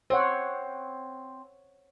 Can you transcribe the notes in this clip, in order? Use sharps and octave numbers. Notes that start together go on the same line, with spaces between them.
C4 C5 C#5 F#5